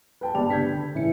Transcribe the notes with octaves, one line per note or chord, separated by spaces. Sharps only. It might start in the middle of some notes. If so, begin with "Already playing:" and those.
B4 G5 A5
G1 G4 B4 D5 A5 F7
C#3 D4 G6 G#6 B6
D3 B4
A2 C#3 E3 C#4 E4 C#7